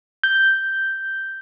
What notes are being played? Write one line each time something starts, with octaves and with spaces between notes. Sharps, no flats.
G6